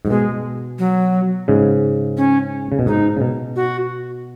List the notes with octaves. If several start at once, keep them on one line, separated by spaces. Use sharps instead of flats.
G#2 F#3
B2 G#3
F#3
G#2 C#3
C#4
C#3
B2
G#2 D#4
C#3
B2
F#4